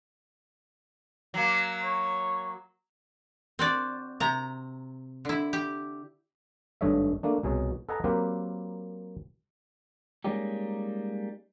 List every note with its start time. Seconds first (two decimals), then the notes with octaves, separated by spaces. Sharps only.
1.34 F#3 A#3
1.82 C#5
3.59 C4 F#4 D5
4.20 C3 A#5
5.25 D3 E4
5.53 G4
6.81 G#1 G2 A3 C#5 D#5 E5
7.23 A3 A#3 D4
7.43 C2 B2 G#4 C#5
7.89 A4 B4 D#5 F#5 G#5 A#5
8.04 F#3 A#3 C4 G4 A#4 B4
10.24 G3 G#3 A#3 C#4 D#4 G4